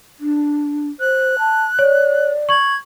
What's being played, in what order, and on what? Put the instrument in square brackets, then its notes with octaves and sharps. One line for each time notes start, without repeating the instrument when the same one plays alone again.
[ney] D4
[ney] C5 [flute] F#6
[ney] A5
[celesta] C#5 [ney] D5
[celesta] C#6 F#7 [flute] G#6